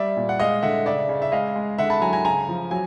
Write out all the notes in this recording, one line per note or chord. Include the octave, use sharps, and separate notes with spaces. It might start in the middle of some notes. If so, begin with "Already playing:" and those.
Already playing: G3 D5 E5
A#2
F#5
G#3 D#5 F5
D3 E5 F#5
C#3 D5 E5
C#3
E5
G#3 D#5 F5
G#3
D3 E5 F#5
A5 B5
F#3 G#5 A#5
G#5 A#5
C#3 G#5 A#5
F3
F#3 G#5